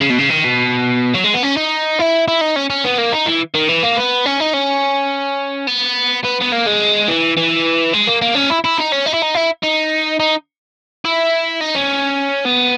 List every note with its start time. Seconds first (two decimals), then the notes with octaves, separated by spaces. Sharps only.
0.01 C#3
0.10 B2
0.19 C#3
0.30 D#3
0.44 B2
1.14 F#3
1.24 G#3
1.34 B3
1.43 C#4
1.57 D#4
1.99 E4
2.28 E4
2.41 D#4
2.56 C#4
2.70 C#4
2.85 B3
2.98 A#3
3.13 D#4
3.26 E3
3.55 D#3
3.69 E3
3.83 A#3
3.97 B3
4.26 C#4
4.40 D#4
4.53 C#4
5.67 B3
6.24 B3
6.41 B3
6.52 A#3
6.66 G#3
7.08 E3
7.37 E3
7.93 G#3
8.08 A#3
8.22 A#3
8.35 C#4
8.50 E4
8.64 E4
8.78 D#4
8.92 C#4
9.06 D#4
9.14 E4
9.22 D#4
9.35 E4
9.63 D#4
10.20 D#4
11.05 E4
11.61 D#4
11.75 C#4
12.46 B3